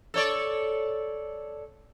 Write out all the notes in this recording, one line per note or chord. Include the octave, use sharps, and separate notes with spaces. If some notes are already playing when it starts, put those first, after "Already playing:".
A4 C#5 D5